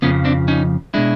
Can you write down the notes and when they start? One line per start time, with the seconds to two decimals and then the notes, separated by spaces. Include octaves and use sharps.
0.02 F2 C#3 F3 B3 C#4
0.25 C4 D4
0.48 C#4 D#4
0.94 B2 G#3 D4 E4